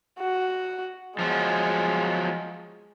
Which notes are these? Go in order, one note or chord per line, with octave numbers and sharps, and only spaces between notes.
F#4
F3 F#3 G#3 B3